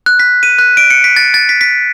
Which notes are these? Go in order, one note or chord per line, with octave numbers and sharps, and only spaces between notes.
F#6
B6
D#7
F#6
D7
C#7
B6
A6
A6
B6
B6